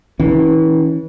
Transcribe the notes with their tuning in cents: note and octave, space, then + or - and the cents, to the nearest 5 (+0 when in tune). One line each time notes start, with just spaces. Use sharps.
E3 -35 C#4 +0